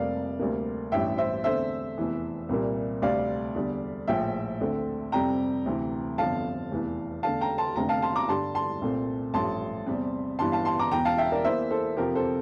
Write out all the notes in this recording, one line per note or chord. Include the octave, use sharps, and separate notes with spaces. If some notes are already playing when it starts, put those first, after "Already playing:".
Already playing: F1 F2 C3 G3 A#3 D5 F5
D2 C3 G3 A#3
A1 G2 E3 E5 G5
C5 E5
E2 D3 A3 C4 C5 E5
F1 E2 E3
C2 A#2 G3 A#3
D2 C3 G3 D5 F5
E2 D3 G3
A#1 A2 F3 E5 G5
D2 D3 A3 C4
F2 C3 G3 G5 A#5
D2 C3 E3
G1 F2 D3 F3 F5 A5
F1 E2 E3
E2 D3 A3 F5 A5
G5 A#5
A5 C6
F1 F2 D3 G5 A#5
F5 A5
A5 C6
A#5 D6
G2 D3 G3 A5 C6
A5 C6
C2 A#2 A3 C4
A1 G2 F3 A3 A5 C6
E2 C3 G3 C4
G1 G2 E3 G3 A5 C6
F5 A5
A5 C6
A#5 D6
E1 E2 E3 G5 A#5
F5 A5
E5 G5
A#4 D5
E2 E3 A#3 C5 E5
A4 C5
F2 C3 F3 G4 A#4
A4 C5